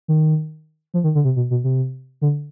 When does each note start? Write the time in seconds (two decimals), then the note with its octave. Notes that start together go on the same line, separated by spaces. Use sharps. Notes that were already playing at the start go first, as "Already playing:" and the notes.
0.08 D#3
0.94 F3
1.04 D#3
1.15 D3
1.25 C3
1.36 B2
1.51 B2
1.64 C3
2.21 D3